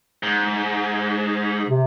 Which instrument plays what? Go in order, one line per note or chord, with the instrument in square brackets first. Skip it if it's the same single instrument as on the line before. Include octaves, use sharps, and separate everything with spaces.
[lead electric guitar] G#2
[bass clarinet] C3